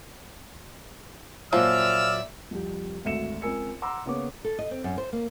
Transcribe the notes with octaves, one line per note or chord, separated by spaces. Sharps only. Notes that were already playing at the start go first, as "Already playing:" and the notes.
A#2 F3 F#3 C5 D5 E5 E6 F6
C2 F2 G4
G#1 D2 A4 E5 C#7 E7
C#2 C4 A#4 G#5 E6 C#7
F#5 A#5 C6 D6 E6
C#3 A#3 B3 C#5 D6
A4
D#5
C4
F#2
C5
A#3